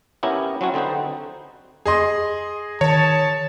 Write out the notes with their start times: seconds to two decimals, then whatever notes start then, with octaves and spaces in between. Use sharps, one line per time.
0.23 B3 C#4 E4 G4 A#4 A#5
0.61 F#3 C4 C#4 E4 F#4
0.74 D3 C4 D#4 B4 C5
1.86 G#4 D#5 C6
2.81 D#3 C#5 A5